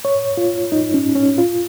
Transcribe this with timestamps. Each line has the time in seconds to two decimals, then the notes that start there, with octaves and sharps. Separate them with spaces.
0.05 C#5
0.37 F4
0.72 D#4
0.94 C#4
1.15 C#4
1.38 F4